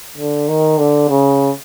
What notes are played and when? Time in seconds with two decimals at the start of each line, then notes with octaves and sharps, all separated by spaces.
0.17 D3
0.48 D#3
0.78 D3
1.09 C#3